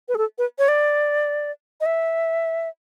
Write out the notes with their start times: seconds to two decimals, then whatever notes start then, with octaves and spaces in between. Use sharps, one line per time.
0.09 B4
0.15 G#4
0.18 A4
0.38 B4
0.59 C#5
0.68 D5
1.81 D#5
1.86 E5